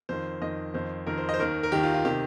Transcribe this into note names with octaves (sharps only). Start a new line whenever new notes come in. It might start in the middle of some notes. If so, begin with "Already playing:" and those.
F2 D#3 C5
F2 D#3 D#5
F2 D#3 C5
F2 D#3 A#4
C5
D#5
C5
D#2 D#3 A#4
A#4
D#2 D#3 G4
F4
F4
C3 D#3 G4